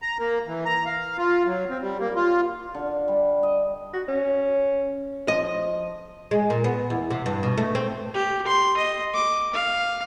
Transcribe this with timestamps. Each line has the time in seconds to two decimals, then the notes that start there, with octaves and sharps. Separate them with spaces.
0.02 A#5
0.19 A#3
0.47 E3
0.65 A#5
0.86 F5
1.18 F4
1.46 F#3
1.70 C4
1.82 G3
2.00 A#3
2.16 F4
2.75 D3
3.08 G3
3.43 D#5
3.93 F#4
4.08 C#4
5.28 F3 D#5
6.31 G#3
6.50 A#2
6.64 B3
6.90 E2
7.10 C3
7.26 G2
7.43 B2
7.58 A3
7.75 C4
8.14 G4
8.47 C6
8.77 D#5
9.14 D6
9.54 F5